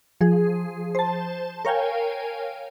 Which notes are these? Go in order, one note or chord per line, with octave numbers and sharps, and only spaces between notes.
F3 G#4
C5 A5
A#4 C#5 F5 G5 G#5